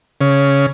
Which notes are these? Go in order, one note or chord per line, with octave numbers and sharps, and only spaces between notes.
C#3